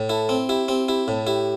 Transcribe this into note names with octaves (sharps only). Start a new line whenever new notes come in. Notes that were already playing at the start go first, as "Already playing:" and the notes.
Already playing: A2
E4 A4
C4
E4 G4
C4 G4
E4 G4
A2 A4
E4 G4